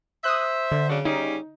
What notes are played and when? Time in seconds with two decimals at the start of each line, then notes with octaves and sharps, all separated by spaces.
0.24 C5 E5 D#6 F#6
0.72 D3
0.89 C#3 F#3 D4
1.05 C#3 G3 C#4 D#4